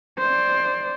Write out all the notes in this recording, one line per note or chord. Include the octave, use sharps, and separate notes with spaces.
C5 D5